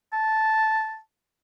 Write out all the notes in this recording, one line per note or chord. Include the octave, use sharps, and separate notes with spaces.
A5